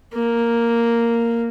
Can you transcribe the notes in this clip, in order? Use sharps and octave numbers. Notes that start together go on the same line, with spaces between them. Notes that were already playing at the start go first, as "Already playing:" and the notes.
A#3